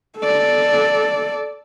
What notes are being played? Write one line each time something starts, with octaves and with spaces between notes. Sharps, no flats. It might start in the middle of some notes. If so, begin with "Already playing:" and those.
A4 D5